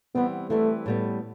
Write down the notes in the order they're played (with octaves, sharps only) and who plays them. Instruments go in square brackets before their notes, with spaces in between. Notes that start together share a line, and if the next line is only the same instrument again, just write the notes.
[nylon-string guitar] E3 G3 C4 [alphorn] B3
[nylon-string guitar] E3 G3 C4 [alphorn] A3
[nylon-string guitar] A2 G3 B3